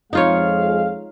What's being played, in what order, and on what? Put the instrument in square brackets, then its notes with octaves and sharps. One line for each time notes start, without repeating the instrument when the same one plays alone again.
[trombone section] F2 G#3 [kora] D#4 F4 C#5 [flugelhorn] F5